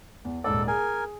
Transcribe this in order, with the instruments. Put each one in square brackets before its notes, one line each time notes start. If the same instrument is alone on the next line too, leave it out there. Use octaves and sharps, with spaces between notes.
[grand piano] E2
[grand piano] D#1 G#2 D5 [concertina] A4
[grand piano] G#4 [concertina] A#4 G#5